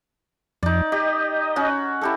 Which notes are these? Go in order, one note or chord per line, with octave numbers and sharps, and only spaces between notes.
F2 D#4 D5
G4 D#5
C#4 F#4
E4 G4 A4